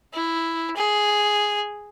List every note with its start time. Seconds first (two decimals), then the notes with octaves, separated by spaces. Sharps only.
0.14 E4
0.76 G#4